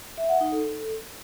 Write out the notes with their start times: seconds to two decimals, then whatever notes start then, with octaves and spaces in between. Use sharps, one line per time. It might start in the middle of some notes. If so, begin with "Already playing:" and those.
0.18 E5
0.29 F#5
0.41 D#4
0.52 A4